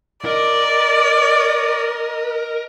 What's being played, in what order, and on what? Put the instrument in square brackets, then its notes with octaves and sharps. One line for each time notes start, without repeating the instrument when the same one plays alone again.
[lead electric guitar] A#4 [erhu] D5 [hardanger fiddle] D#5